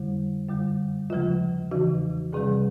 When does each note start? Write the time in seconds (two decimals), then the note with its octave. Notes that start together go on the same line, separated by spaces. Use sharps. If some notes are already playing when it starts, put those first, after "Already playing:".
Already playing: F2 D3 G3
0.49 F#2 D3 G3
1.10 D#2 C#3 F3 G#3 F4
1.71 E2 C#3 E3 F#4
2.33 D2 C3 D#3 G3 G#4